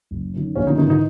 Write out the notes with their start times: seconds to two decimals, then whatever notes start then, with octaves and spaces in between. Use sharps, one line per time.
0.11 F#1
0.34 F#2 D#3
0.56 A#1 C#3 C#4
0.67 D#3 D#4
0.78 G#2 D#3 E3 D#4
0.90 D#3 D#4